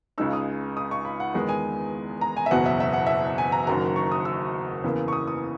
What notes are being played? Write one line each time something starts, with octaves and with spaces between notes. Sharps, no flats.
C#2 C#3 G#3 D#4 E6
D#6
D#6
C#6
B5
F#5
E2 D#3 G#3 B3
G#5
A#5
G#5
E5
F#1 E2 B2 F#3 F#5
E5
E5
F#5
E5
G#5
A#5
F#1 F#2 D#3 F#3 A#5
C#6
D#6
E6
E2 C#3 E3 A#3
C#6
D#6
D#6